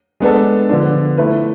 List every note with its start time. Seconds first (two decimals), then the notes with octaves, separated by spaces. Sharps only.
0.20 G#3 B3 D4 A4
0.69 D3 F3 B3 D4
1.18 A3 E4 B4